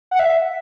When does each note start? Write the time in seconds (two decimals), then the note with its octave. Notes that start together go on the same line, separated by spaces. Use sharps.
0.11 F#5
0.19 E5